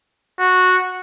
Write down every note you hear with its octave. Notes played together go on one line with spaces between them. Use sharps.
F#4